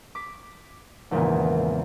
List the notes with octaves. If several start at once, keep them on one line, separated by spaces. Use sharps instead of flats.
D6 B6
G#1 E2 A#2 C#3 A#3 G#5